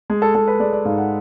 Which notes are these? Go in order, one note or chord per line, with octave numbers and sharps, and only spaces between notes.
G#3
A4
G#3 A4
B4
G#3 D5
D5
G#2 F5
F#5